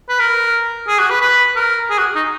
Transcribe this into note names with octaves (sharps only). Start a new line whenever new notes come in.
B4
A#4
G#4
F#4
B4
B4
A#4
G#4
F#4
D#4